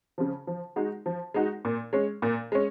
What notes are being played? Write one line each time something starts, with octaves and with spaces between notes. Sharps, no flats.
C#3 F3
F3
G#3 D#4 F#4
F3
G#3 D#4 F#4
A#2
G#3 C#4
A#2
G#3 C#4